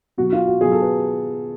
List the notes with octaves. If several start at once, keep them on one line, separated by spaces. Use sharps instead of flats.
B2 F#3 F#4
F4
F#4
B2 F#3 G#4
A4
B4